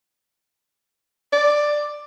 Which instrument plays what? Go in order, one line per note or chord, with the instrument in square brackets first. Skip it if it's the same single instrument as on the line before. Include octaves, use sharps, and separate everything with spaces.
[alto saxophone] D5